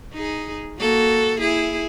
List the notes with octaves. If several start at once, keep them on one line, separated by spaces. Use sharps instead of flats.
D#4 G#4
A#3 F#4 A4
E4 G#4